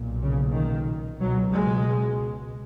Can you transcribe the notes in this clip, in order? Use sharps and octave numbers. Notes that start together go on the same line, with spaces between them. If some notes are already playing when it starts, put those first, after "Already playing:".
Already playing: B1 A#2
C#3
D#3
C#2 B2 F#3
G#3